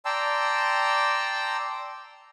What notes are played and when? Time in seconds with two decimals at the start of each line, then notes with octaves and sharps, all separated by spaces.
0.05 D5 G5 A5 A#5 C6 E6